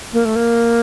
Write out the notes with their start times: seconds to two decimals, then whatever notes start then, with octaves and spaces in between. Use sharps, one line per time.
0.13 A#3
0.25 A3
0.36 A#3